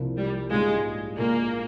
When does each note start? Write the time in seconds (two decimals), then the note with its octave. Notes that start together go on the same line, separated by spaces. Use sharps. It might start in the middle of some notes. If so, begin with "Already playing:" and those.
Already playing: C2 C3 F3 A#3
0.17 G3
0.50 A#1 G#2 G3 G#3 C#4 F4
1.18 A#1 A#2 G#3 A#3